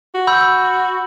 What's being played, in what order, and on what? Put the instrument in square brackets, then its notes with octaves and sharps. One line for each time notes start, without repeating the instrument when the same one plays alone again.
[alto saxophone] F#4
[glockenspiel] B5 E6 G6
E6